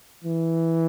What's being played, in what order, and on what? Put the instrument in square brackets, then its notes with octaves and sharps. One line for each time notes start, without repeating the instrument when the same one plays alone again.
[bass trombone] E3